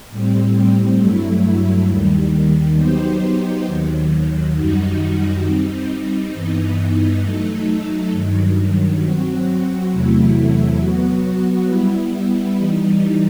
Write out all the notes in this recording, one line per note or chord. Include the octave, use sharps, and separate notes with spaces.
A2 G3 C4
G2 F#3 A3 E4
D#2 D#3 G3
F#3 B3 D#4 G4 C5
D#2 D#3 F#3
F#2 D#3 G3 D#4 F#4
G3 C4 D#4
G2 E3 B3 D#4
F#3 A3 D#4 A4
G2 D#3 F#3
F#3 C4 F#4
E2 C3 F#3 A3 E4
F#3 B3 F#4
G3 B3 E4
E3 G3 D#4